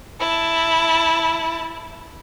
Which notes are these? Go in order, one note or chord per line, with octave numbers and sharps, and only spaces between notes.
E4 A5